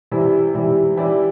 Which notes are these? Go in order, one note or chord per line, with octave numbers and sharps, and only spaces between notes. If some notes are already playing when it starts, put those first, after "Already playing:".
C3 E3 G3 E4
C3 E3 G3 E4
E3 G3 E4 G4 D5